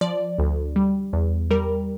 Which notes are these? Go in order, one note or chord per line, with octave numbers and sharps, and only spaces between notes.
F3 D5
D2
G3
E2
G3 A#4